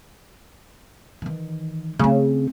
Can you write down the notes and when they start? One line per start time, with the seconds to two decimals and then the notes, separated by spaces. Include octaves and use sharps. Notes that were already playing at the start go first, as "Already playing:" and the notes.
1.22 D#3 E3
1.99 C#3 A3 C4